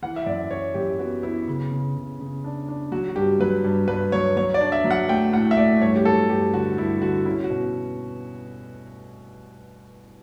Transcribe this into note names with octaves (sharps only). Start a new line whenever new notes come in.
E3 F#5
E5
F#2 D5
F#2 C#5
F#2 G4
B3 F#4
B3 E4
C#3
C#3
C#3
C#3
D4
D4
F#3 F#4
F#4
G2 G4
F#3 B4
G2
G2 B4
F#3 C#5
F#3 C#5
D5
D4
E5
F#3
F#5
A3 G5
A2 F#5
E5
A3 D5
G2 C#5
G4
F#3 A4
G2 G4
D3 F#4
G2 E4
D3 F#4
C#4 E4
F#4
B2